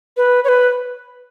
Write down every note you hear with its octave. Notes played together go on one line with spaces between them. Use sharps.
B4
C#5
B4